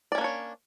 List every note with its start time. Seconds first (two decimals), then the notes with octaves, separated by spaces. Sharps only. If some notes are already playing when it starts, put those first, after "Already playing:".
0.12 D5
0.15 C#4
0.18 A#3
0.21 D4
0.24 C#5